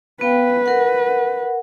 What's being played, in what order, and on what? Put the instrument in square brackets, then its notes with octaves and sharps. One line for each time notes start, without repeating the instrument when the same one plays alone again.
[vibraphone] B3 F5 G5 [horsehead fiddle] B4
[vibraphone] A#4 F#5